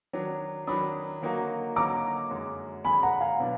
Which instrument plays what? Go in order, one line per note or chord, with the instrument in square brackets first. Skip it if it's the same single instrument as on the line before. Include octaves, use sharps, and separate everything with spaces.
[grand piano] D#3 F#3 D4
[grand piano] D#3 F#3 D4 [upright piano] B5 D#6
[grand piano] D3 F#3 A#3 D#4 F#4
[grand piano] D3 F#3 A#3 D#4 F#4 [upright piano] A#5 D6
[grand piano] F#2 D3 G#3
[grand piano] F#2 D3 G#3 [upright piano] G#5 B5
[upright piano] F#5 A#5
F5 G#5
[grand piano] B2 F#3 B3 D4